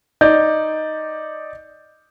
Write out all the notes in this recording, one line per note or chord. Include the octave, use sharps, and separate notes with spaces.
D#4 D5 G6